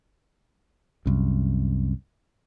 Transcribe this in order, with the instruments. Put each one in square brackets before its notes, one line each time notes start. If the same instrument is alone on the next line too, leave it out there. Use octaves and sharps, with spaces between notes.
[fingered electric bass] C2 F#2